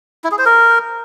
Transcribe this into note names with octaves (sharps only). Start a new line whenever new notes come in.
E4
G#4
C5
A#4